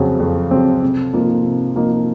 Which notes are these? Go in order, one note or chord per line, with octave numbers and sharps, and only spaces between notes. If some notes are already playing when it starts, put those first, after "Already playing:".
Already playing: F2 C#3 F#3 C4
F2
C#3 F#3 C4
C3
F3 A#3 D#4
C3
F3 A#3 D#4